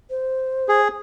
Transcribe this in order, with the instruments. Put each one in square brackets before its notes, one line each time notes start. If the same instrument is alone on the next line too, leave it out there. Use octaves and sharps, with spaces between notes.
[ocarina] C5
[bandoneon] G#4